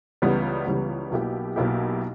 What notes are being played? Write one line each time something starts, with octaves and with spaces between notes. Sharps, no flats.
C#2 C#3 E3 G3 B3
C#2 C#3 E3 G3 B3
B1 B2 A#3 E4 G4
B1 B2 A#3 E4 G4